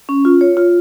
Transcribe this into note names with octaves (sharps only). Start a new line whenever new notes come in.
C#4
F4
C#5
F4